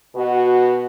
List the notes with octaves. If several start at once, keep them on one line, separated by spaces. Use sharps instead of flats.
B2 F#4